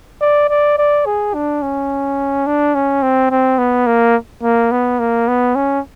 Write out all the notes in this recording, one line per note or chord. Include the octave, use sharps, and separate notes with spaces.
D5
D5
D5
G#4
D4
C#4
D4
C#4
C4
C4
B3
A#3
A#3
B3
A#3
B3
C#4